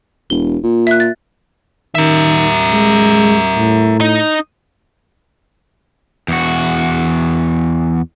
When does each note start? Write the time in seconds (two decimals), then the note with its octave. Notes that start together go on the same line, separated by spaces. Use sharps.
0.30 E1 G7
0.63 A#2
0.87 E5 F#6
1.00 A6
1.95 D#3 A#4 E5
2.72 G#3
3.55 A2
4.01 D#4
6.28 E2 F#4